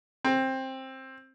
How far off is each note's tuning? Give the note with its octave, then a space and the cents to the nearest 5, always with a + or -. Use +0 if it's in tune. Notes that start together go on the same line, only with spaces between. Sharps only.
C4 +15